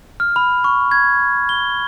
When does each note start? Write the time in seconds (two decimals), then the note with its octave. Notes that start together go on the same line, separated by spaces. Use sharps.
0.20 F6
0.36 B5
0.64 C#6
0.91 G#6
1.49 G7